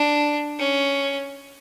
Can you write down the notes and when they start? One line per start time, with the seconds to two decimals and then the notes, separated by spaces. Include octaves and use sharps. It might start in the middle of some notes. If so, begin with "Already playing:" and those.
Already playing: D4
0.59 C#4